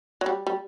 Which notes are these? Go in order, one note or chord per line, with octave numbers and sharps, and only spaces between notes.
F#3
G3
G3